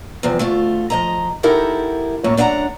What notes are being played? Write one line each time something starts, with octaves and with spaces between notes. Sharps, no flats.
E2 G2 C3 F3
D2 A3 F4
F3 D#5 A#5
D#4 E4 G4 A4 A#4 F#5
F#2 A2 A#3 C#5
F#2 D4 F#5 G#5 A#5